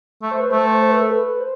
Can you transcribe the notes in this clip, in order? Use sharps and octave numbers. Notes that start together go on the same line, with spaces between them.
A3
C5
B4
A3 C5
C5
B4
A4
B4
C5